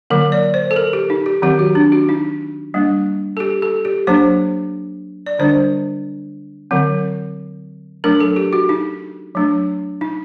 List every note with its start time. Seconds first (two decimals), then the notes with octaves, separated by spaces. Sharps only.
0.10 D3 F#3 A#3 A#4
0.32 D5
0.54 C5
0.71 A4
0.76 A#4
0.93 G4
1.10 D#4
1.26 G4
1.42 D#3 F#3 C4 G4
1.59 F#4
1.75 D4
1.92 F#4
2.09 D#4
2.74 G3 A#3 D4
3.37 A4
3.40 G4
3.62 A4
3.85 G4
4.07 F#3 A#3 D4 C5
5.26 D5
5.39 D3 G3 D4 C5
6.71 D3 F#3 C4
8.04 F#3 A3 D4 A#4
8.20 A4
8.36 G4
8.53 F#4
8.69 D#4
9.35 F#3 A3 D4
10.01 D#4